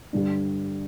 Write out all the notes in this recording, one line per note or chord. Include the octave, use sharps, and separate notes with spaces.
G2 D3 G3